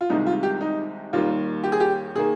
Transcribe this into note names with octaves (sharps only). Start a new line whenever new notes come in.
F4
C2 C3 D#3 G#3 D#4
F4
G4
D#4
D#2 D#3 G3 A#3 F4
G4
G#4
G4
D#3 A#3 G#4